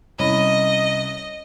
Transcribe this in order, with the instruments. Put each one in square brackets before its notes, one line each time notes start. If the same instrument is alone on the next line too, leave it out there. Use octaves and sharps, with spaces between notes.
[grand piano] C2 C#4 B5 [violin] D#5